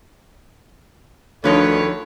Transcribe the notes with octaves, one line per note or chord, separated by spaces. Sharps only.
D2 D3 D#3 F3 D#4 A4 B4 C#5